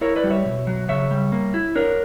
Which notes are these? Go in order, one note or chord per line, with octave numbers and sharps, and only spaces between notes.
E4 A#4 C#5
B4 D5
G3
C#5 E5
B2
F#3
C#3 C#5 E5
G3
A#3
E4
D4 A#4 C#5